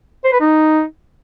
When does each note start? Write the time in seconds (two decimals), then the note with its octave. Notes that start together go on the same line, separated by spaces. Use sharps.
0.24 C5
0.32 B4
0.40 D#4